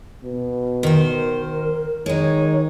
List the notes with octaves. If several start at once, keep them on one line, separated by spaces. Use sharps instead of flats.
B2
D#3 A#4 C5
D#3 G#3 D#4 C#5